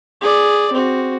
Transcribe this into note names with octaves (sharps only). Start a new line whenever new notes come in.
G#4 D5
C4 F#4